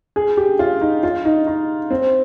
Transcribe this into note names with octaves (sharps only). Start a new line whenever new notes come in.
G#4
G4
F4
D#4
F4
D#4
D#4
C4